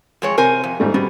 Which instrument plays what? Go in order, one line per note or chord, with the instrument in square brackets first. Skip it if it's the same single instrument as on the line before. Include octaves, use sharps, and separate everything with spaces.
[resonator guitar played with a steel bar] F2 G#3 C#5
[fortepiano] C3 [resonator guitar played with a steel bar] A#4 C5 G#5
[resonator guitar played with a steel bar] F2
[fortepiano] G#2 G3 A3
[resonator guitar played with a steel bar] B2 [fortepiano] G3